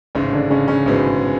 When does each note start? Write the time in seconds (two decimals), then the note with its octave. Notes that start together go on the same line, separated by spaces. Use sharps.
0.15 A1 G#2 C#3 G#3 C#4
0.32 D3 D4
0.50 C#3 C#4
0.68 C#3 C#4
0.86 A1 G#2 B2 G#3 B3